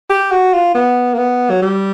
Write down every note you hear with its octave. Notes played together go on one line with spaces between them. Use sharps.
G4
F#4
F4
B3
A#3
B3
F#3
G3